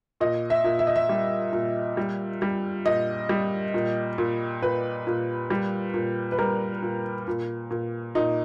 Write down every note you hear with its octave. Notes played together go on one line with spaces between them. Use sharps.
A#2 D#5
E5
A#2
E5
D#5
E5
G3
A#2
G3
G3
A#2 D#5
G3
A#2
A#2
A#2 B4
A#2
G3
A#2
B4
G3 A#4
A#2
A#2
A#2
A#2 D#4